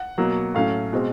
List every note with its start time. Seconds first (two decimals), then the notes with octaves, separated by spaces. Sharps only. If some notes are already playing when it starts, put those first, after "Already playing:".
Already playing: F#5
0.18 B2 F#3 A#3
0.55 A2 F#3 A3 C#4 F5
0.93 B2 G#3 C4